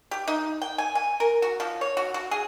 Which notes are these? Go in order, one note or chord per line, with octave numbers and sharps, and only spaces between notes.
G4
D#4
G5
G#5
G#5
A#4
F#4
F3
C#5
F#4
F#4
G#4